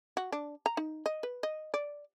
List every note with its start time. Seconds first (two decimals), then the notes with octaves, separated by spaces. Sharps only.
0.17 F#4
0.32 D4
0.66 A#5
0.77 D#4
1.06 D#5
1.23 B4
1.43 D#5
1.74 D5